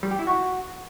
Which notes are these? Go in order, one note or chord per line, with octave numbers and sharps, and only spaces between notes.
G3
G4
E4
F#4